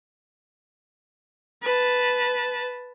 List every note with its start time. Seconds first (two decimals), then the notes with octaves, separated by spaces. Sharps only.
1.63 B4 A5